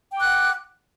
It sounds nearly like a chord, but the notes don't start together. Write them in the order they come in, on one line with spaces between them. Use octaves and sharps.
G5 D6 F#6 F#5